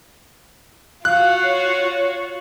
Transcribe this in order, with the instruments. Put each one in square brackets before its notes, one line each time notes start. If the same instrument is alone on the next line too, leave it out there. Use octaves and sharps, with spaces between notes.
[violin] F4 F#4 [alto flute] F5 [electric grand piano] F#6
[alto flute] C#5